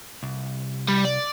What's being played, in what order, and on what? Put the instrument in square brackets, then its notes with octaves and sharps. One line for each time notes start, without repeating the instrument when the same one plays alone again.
[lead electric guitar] C2
[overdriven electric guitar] G3
D5